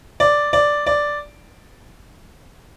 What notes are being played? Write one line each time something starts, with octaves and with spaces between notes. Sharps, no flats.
D5
D5
D5